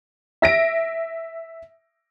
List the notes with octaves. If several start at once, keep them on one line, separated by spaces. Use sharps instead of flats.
E5 A#6 D7